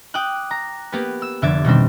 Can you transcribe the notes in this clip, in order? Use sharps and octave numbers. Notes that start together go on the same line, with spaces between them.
G5 D6 D#6 F#6
A#5
A#3 B3 G4 B4
E6
F1 D3 E5 D6 G#6 A6
B2 D#3 G3 C4